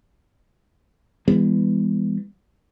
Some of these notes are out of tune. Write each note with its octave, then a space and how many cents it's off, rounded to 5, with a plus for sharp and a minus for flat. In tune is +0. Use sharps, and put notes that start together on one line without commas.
E3 +0 G#3 -45 B3 +10